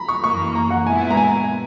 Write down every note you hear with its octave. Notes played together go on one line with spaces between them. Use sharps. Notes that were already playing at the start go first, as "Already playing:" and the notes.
Already playing: A#5 B5
C#6
F#2 E3 A#3 C#6
A#5
F#5
A#2 G#3 B3 E4 G#5
A#5
G#5